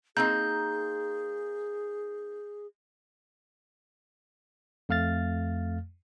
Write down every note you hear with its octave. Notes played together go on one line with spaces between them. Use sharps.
A#3 C4 D#4 G#4 G6
F2 A3 F5 F6 A6